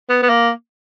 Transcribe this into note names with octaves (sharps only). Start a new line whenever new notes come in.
B3
B3
A#3